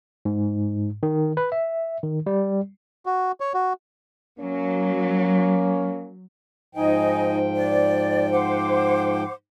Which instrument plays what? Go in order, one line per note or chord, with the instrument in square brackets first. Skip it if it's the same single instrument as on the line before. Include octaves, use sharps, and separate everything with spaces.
[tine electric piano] G#2
D#3
B4
E5
D#3
G3
[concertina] F#4
C#5
F#4
[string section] F#3 [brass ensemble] A#3 C#4
[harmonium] G#2 F3 G5 [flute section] D#4 D#5 G#5
[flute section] D5
C5 F#5 D6